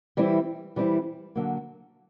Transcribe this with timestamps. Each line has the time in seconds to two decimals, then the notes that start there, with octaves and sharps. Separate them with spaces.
0.17 E3 G3 C4 E4
0.76 E3 G3 C4 E4
1.36 D3 F#3 A#3